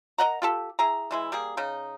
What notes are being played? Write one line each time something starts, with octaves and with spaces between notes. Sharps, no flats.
A#4 D#5 F#5 A#5
F4 G4 A4
E4 G#4 A#5
E3 G#3 E4
G3 A#3 G#4
C#3 D#4